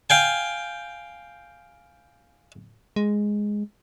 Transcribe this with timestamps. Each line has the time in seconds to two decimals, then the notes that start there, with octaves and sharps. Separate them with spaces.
0.10 F5 G5 G#5
2.96 G#3